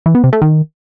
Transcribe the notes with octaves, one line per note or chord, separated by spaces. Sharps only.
E3
B3
C3
A3
D#3